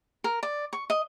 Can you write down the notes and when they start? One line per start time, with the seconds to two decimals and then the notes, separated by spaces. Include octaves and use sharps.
0.24 A#4
0.43 D5
0.73 C#6
0.90 D#5